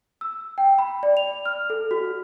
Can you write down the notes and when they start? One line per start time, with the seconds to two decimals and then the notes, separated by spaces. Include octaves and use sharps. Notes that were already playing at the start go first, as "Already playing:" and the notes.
0.21 E6
0.58 G5
0.79 B5
1.03 D5
1.17 F7
1.46 F6
1.70 A4
1.91 F#4